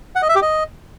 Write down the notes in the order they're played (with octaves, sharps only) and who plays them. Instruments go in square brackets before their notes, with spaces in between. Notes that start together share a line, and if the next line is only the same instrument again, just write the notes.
[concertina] F#5
D#5
E5
G4
D#5